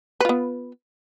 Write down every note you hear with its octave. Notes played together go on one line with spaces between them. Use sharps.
B3 F4 B4